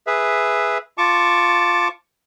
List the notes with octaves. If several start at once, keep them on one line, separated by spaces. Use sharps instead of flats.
G#4 B4 E5
F4 A5 C#6 D6